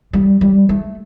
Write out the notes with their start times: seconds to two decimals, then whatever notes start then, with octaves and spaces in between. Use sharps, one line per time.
0.13 G3
0.41 G3
0.69 A3